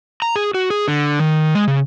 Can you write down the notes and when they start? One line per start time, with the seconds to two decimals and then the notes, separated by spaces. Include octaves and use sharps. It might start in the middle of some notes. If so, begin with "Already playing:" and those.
0.22 A#5
0.36 G#4
0.54 F#4
0.70 G#4
0.88 D3
1.20 D#3
1.55 G#3
1.68 C#3